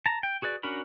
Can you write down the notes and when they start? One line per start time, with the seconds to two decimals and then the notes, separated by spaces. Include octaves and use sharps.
0.06 A5 A#5
0.23 G5
0.42 F#4 G#4 B4 D5
0.63 C#4 D4 F#4 A#4 B5